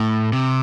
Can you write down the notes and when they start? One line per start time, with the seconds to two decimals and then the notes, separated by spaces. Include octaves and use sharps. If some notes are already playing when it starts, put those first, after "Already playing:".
Already playing: A2
0.33 C3